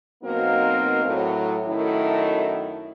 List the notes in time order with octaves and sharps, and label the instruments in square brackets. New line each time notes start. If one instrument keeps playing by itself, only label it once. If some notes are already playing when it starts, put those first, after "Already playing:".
[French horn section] B2 F#3 A#3 C4 D#4 A#4
A2 F#3
F#2 D#3 A3 E4